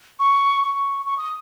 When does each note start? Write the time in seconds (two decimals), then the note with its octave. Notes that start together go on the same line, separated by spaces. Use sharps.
0.20 C#6
0.63 C#6
1.06 C#6
1.18 D#6